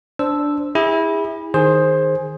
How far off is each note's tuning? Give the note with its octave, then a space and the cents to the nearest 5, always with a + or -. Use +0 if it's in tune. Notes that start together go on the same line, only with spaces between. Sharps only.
D4 -5 C5 -5 E6 +0
E4 -15 G#4 -40
D#3 +0 G#4 +0 C5 +15